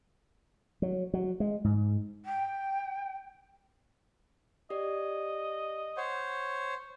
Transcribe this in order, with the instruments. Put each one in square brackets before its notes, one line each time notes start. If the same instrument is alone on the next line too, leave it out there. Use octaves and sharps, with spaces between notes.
[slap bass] F#3
F#3
G#3
G#2
[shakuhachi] G5
[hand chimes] G4 D5 [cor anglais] D#5
[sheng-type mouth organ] C5 C#5 [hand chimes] F#5